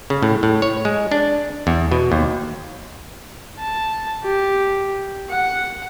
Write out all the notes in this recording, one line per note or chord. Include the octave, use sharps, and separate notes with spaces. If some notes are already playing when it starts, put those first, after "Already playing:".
C#3
A2
A2
C#5
G#3
D4
E2
B2
D#2
A5
G4
F#5